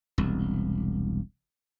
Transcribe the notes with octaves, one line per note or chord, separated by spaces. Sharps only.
E1 C2